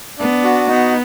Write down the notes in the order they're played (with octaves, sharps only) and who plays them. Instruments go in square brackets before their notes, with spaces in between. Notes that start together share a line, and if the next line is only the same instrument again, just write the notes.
[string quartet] B3 [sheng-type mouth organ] D4
[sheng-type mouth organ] F#4
[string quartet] B3 [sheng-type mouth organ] D#4